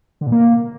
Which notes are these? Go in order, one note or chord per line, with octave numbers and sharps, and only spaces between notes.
D3
A#2
A#3